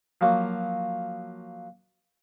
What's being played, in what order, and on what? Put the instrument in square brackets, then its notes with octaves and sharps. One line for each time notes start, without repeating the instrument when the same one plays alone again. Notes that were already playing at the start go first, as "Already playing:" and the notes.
[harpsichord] F3 F#3 A#3 F#4